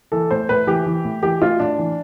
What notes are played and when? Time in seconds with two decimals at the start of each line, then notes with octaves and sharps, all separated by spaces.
0.12 E3 A4
0.31 A2 C5
0.49 A2 B4
0.67 E3 G4
0.86 E3
1.05 A2
1.23 E3 G4
1.42 A2 F4
1.60 A2 D4
1.78 E3